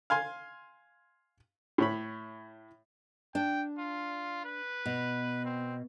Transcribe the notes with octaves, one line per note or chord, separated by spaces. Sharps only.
F5 G#5 C6
A2 C#5 B5
D4 G5
F4
B4
B2
C4